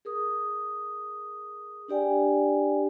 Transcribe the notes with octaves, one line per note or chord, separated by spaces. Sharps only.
G#4 A#4 D#6
D4 G4 D5 G5 G#5